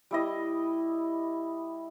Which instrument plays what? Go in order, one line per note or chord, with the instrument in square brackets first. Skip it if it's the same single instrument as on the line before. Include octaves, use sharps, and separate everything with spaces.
[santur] G3 E4 D#5